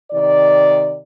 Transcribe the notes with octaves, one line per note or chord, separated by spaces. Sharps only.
C3 D#3 D5